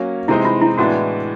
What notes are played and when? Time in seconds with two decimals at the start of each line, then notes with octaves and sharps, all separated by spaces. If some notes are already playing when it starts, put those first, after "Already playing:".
Already playing: F#3 A#3 C#4
0.28 C3 E3 G#3 C4 D#4 E4
0.45 F4
0.61 E4
0.77 A2 E3 G#3 B3 D4 F#4